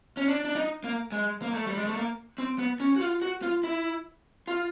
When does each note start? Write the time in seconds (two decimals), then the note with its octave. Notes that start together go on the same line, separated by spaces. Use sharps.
0.17 C#4
0.28 D4
0.45 D4
0.56 D#4
0.84 A#3
1.12 G#3
1.42 A#3
1.54 A3
1.67 G3
1.77 G#3
1.86 A3
1.96 A#3
2.38 C4
2.59 B3
2.80 C#4
2.96 F#4
3.01 F4
3.22 F#4
3.42 F4
3.64 E4
4.47 F4